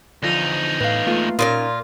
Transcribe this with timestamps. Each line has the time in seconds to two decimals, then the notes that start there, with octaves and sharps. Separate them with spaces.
0.23 E2 D3 F3 D#4 D#7
0.80 A2 B4 F5
1.07 A3 A#3 F4
1.39 A#2 C#3 C#4 D#4 F4 A#4